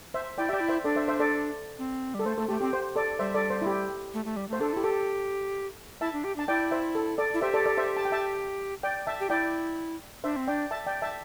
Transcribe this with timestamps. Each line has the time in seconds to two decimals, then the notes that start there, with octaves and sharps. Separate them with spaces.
0.14 C5 E5
0.38 E4 D5 G5
0.49 G4 D5 E5 G5
0.60 E4
0.69 C5 E5
0.84 D4 A4 D5
0.96 C5 E5
1.08 C5 E5
1.20 A4 D5
1.79 C4
2.14 G3
2.19 A4
2.25 A3 C5
2.37 A3 A4
2.49 A3 G4
2.61 C4 G4
2.73 C5
2.96 A4 D5
3.19 G3 C5 E5
3.35 A4 D5
3.50 C5
3.62 E4
3.66 G4
4.14 A3
4.25 A3
4.37 G3
4.49 A3
4.53 C5
4.60 D4 A4
4.73 E4 G4
4.84 G4 A4
6.01 E4 E5 A5
6.13 D4
6.24 G4
6.36 D4 A5
6.48 E4 D5 G5
6.71 C5 E5
6.95 A4
7.18 A4 D5
7.34 E4
7.42 G4 C5 E5
7.54 A4 D5
7.66 A4 D5
7.77 C5 E5
7.97 A5
8.05 G5
8.12 E5 A5
8.83 D5 G5
9.07 E5 A5
9.20 G4
9.30 E4 D5 G5
10.24 D4 C5 E5
10.36 C4
10.47 D4 D5 G5
10.71 E5 A5
10.87 D5 G5
11.02 E5 A5